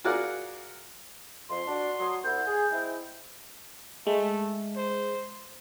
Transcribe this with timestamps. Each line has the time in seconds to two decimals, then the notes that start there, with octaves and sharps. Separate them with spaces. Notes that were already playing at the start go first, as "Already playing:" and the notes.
0.04 F4 F#4 G#4 A#4 D5 F#5
1.49 F2 C6
1.67 D4 F#4
2.00 F#3 D#6
2.24 C2 E4 F#5 G6
2.47 G#4
2.72 G#3 C4 E4
4.07 G#3 A3
4.76 C5